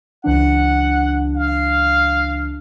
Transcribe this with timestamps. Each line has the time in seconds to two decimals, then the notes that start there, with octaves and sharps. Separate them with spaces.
0.24 C#2 E3 D4 F#5
1.35 F5